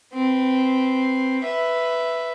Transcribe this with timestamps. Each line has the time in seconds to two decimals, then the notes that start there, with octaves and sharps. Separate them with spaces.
0.14 C4 B4
1.43 B4 E5